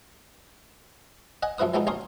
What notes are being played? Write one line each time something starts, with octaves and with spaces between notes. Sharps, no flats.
D#5 F#5 G#5
F#2 F3 E4 B4 D#6
B2 F3 G#3 B3 D#4
A1 A#3 C#4 C6 C#6 D#6